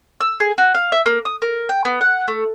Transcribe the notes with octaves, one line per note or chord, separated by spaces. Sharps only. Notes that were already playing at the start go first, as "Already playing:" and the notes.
E6
G#4
F#4
F5
E5
A#3
D#6
A#4
G5
B3
F#5
A3